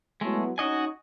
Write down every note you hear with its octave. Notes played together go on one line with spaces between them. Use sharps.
F#3 G#3 A3 B3 E4
C#4 D#4 F#4 D#5 G#5